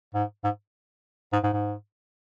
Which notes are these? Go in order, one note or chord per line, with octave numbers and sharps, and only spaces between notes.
G#2
G#2
G#2
G#2
G#2